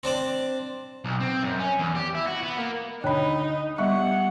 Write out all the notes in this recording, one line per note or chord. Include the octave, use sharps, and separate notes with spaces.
C4 D4 C5 D5
B1
C4
F#2
C#4
E2
G4
E4
F#4
B3
A#3
D2 D#4 C#5 G5 B5 F#6
G3 B3 D#5 E5 F#5 C#6 F#6